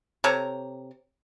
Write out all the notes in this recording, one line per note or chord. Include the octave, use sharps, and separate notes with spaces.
C3 A4 C#5 A#5